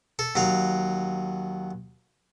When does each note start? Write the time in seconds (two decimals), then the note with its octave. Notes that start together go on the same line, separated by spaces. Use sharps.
0.19 A4
0.36 D#2 F#3 F5